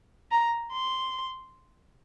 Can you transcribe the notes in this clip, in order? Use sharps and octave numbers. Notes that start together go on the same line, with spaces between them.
A#5
C6